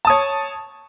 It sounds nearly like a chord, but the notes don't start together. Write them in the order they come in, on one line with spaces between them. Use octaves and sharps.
A5 D#6 C#5